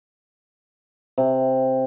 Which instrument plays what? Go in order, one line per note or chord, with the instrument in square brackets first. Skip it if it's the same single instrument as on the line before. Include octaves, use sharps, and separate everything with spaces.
[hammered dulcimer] C3